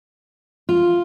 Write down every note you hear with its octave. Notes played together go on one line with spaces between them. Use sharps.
F4